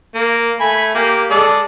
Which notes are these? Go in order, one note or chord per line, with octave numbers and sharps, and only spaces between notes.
A#3
A3 G#5 B5
A#3 G4
G#3 A4 D5